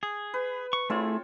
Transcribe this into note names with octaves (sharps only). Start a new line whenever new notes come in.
G#4
B4
C#6
A3 C4 E4 F4 G#4 C#5